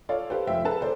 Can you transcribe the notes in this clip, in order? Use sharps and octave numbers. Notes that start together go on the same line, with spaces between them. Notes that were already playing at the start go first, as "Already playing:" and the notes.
F4 A4 C#5 D5 F5
G4 A4 B4 C5 F5
F1 F4 E5 G5
G#4 A4 B4 A5 A#5
A4 C5 D5